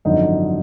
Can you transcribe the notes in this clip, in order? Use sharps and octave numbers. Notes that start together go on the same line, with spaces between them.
G#1 F#2 D3 F3 D#4 D#5